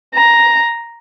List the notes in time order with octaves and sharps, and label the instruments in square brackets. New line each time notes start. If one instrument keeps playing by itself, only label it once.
[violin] A#5